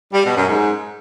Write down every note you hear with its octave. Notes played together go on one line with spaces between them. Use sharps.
G3
B2
F#2
G#2